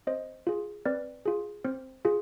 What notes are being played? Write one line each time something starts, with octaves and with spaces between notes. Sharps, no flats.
C4 C5 D#5
F4 G#4
C4 B4 D5
F4 G#4
C4 C5
F4 G#4